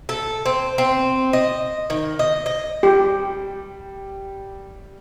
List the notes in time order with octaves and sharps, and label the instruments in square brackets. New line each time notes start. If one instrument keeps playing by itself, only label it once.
[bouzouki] A4
C4
C4
D#5
D#3
D#5
D#5
[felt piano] G3 [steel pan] G4